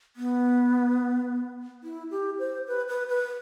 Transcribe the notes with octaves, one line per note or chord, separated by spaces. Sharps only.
B3
E4
G4
C5
B4
B4
B4